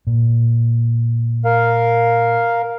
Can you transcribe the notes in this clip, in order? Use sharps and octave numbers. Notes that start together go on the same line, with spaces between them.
A#2
A#4 F5